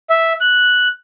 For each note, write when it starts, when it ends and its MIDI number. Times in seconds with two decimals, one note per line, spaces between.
0.10 0.33 76
0.41 0.88 90